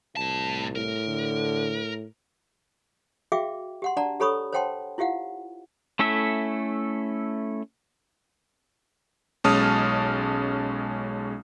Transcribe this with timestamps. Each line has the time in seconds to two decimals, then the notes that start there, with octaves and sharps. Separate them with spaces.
0.17 C2 A2 A5
0.76 A2 A#4
1.08 D3
3.32 F#4 G#4 E5 F5 G5 D6
3.82 G4 F#5 C6
3.97 D4 D5 F#5 A5 A#5
4.20 G4 A4 C#5 B5 C#6 D#6
4.53 C5 C#5 F#5 G5 A5 C6
4.98 E4 F4 G4 F5 F#5
5.99 A3 C#4 E4 A4 E5
9.44 B1 G#3 C#4 A5 D#6 F6